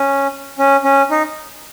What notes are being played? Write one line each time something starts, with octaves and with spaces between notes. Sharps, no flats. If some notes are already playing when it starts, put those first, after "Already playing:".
Already playing: C#4
C#4
C#4
D#4